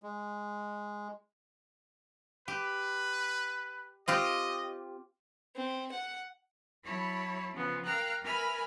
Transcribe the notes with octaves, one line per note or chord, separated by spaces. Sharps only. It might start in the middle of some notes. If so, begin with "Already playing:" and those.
G#3
G4 B4
C4 F4 G4 D#5
C4
F#5
F#3 E4 C#5 A5 B5
C#3 F3 B3
A#4 F5 G5 A#5 F6 F#6
A#4 B4 E5 G#5 B5 F6